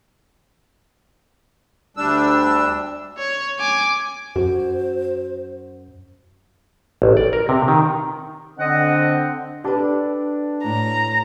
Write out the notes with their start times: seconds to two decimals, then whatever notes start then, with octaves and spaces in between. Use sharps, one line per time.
1.97 D2 G3 D4 E6
3.18 C#5
3.58 G#5 D6
4.36 F#2 F#4 C5
7.02 A1
7.17 D5
7.33 A#4
7.49 C3
7.68 D#3
8.59 D3 C4 D#5 F#5
9.64 D4 G4 A4 B4
10.64 A2 A#5